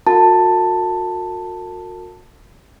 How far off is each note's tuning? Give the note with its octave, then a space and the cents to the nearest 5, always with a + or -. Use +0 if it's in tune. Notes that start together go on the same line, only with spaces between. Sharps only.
F#4 -35 A#4 -40 A5 +10